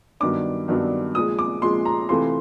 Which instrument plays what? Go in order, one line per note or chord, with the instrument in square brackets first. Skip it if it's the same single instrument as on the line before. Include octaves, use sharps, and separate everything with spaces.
[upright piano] G2 D#3 F#3 B3 D4 D6
G2 D#3 F#3 B3 D4
A#2 F3 G#3 D#6
D6
A#2 F3 G#3 C6
A#5
C3 E3 A3 C4 F4 C6